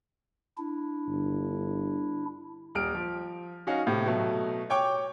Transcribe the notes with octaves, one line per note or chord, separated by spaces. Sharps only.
D4 E4
G1
D#1 F6 D7
F3
C#4 D#4 F#4 F5
A2 C3
B2 F#3 A3
C#5 G5 C#6 D6